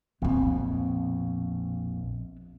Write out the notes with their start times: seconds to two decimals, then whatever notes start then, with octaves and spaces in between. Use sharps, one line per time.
0.22 A#1 F2 B2 B3 C4